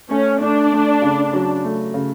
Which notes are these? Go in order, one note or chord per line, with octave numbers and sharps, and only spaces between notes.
A3 C#4
A3 D4
A3
C#3
F#3
A3
C#3